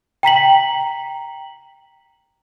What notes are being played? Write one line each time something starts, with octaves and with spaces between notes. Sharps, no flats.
G5 A#5 B6 F#7